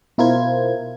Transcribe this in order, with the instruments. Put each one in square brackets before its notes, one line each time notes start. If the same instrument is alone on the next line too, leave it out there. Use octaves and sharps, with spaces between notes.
[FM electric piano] B2 E4 F4 A#4 C5 G#6